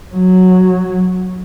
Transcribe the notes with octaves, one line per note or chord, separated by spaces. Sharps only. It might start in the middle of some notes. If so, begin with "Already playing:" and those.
F#3